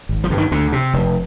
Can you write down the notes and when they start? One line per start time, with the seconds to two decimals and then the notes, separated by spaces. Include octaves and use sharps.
0.09 G#1
0.24 F3
0.30 G2 D3
0.38 D#3
0.51 D2 D3
0.72 C3
0.93 F1